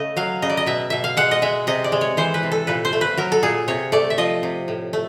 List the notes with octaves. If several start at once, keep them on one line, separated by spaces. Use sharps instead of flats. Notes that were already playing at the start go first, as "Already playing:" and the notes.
Already playing: C#3 A3 D#5
F#3 F5
C#3 D#5
D5
D#5
B2 E5
B2 E5
F5
G#3 F#5
D#5
G#3 E5
C3 D#5
D5
G#3
C#5
E3 C5
B4
C3
A4
A#2 B4
C5
A3
B4
F#3 A#4
A4
A#2 G#4
C3 C#5
A3 D5
E5
F3 D#5
C3
A2
A3